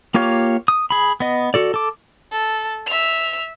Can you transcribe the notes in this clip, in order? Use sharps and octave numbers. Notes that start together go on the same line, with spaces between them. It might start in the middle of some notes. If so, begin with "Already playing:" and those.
A#3 F4 G4 C#5 F5
D#6
G#4 B5
B3 D#5
F#4 A4 D5
A4 D6
A4
E5 F7